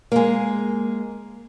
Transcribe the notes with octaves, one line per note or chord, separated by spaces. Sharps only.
G#3 A#3